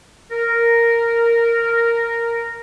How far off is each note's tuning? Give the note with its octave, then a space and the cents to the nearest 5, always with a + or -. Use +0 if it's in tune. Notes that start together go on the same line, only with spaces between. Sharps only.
A#4 -5